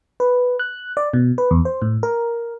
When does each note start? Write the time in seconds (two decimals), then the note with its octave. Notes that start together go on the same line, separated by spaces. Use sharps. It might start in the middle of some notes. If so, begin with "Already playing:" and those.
0.20 B4
0.59 F#6
0.97 D5
1.13 B2
1.38 B4
1.51 E2
1.65 C5
1.82 A2
2.03 A#4